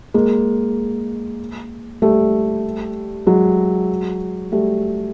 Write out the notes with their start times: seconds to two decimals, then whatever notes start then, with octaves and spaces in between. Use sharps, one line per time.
0.14 G#3 A#3
2.02 G3 A3
3.26 F#3 G#3
4.52 G3 A3